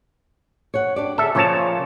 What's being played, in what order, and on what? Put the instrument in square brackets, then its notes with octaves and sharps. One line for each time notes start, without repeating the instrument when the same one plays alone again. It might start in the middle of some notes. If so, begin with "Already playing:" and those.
[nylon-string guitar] C#5 F#5
D4 G4 D5
[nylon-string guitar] D3 G#4 [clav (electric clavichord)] A4 E5
[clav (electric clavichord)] A#2 C#5 A5 [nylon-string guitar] C#3 F3 F4